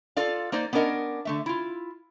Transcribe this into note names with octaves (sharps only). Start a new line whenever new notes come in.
F4 A4 D5 F5
A#3 D#4 C5 D5
B3 C#4 D4 A#4 D#5
D3 A3 E5
E4 F4